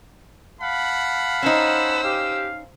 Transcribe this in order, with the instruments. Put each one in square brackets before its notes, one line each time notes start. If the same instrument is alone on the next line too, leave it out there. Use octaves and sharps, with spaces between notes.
[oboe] F5 [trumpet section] F#5 A5 B5
[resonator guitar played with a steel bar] C#4 D#4 [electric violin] C5 E6
[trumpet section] G4 [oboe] F5